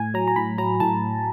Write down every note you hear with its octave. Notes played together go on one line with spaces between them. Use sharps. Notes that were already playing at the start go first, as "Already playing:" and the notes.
Already playing: A2 G#5
F#3 A#5
A#5
A2 B5
F#3 A#5
A2 A5